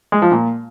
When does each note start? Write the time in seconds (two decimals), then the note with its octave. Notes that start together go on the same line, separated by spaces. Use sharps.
0.12 G#3
0.22 F3
0.32 A#2